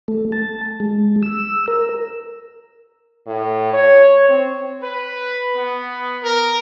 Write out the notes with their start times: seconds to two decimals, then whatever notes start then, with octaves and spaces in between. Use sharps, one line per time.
0.08 A3
0.32 A5
0.80 G#3
1.23 E6
1.68 A#4
3.27 A2
3.74 C#5
4.29 C4
4.81 B4
5.56 B3
6.22 A#4